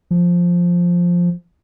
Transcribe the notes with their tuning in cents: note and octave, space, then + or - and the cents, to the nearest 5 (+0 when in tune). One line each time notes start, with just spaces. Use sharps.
F3 +5